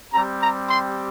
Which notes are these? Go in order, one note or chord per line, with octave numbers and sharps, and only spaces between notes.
G3 C4 G4 A#5
A#5
C6